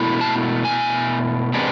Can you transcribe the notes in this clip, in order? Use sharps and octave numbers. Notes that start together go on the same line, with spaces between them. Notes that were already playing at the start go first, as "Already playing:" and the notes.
Already playing: B2 A3 E4
A5
G#5
C3 G#3 B3 D4